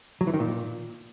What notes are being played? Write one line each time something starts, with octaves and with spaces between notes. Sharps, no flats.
F#3
E3
D#3
A#2